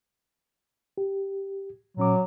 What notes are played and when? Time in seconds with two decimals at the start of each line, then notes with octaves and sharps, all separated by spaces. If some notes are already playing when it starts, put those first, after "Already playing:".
0.98 G4
1.97 A#2 F#3 C#4 D6